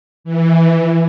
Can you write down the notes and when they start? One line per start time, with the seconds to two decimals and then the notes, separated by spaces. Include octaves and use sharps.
0.24 E3